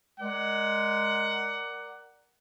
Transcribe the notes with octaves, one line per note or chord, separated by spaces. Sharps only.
G#3 A#4 D5 F#5